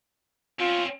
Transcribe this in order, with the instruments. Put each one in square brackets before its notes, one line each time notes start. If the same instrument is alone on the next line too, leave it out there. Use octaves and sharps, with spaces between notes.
[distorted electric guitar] C4 C#4 [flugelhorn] F4